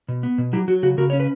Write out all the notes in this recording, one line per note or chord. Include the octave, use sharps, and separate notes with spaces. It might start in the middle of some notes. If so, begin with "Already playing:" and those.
B2
B3
B2
F#3 E4 G4
F#3 F#4
C#3 F#4
C#3 F#4 A#4
C#4 C#5
B4